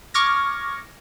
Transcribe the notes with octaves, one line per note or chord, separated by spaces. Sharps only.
C#6 D6 F6 G#6 A#6